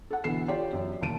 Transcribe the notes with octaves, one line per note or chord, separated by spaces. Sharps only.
A4 F#5
B2 D3 E3 A4 C7 E7
F4 G4 C#5 D5 G5
F#2
E1 D#2 A5 D7 D#7